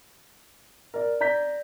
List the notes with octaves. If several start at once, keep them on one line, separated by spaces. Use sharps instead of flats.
A#4 D5
D5 A#5 G6 B6